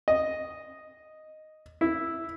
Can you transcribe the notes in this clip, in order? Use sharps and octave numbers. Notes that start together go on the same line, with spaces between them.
D#5
E4